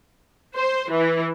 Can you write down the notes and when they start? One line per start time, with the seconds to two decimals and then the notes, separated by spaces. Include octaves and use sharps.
0.55 C5
0.91 E3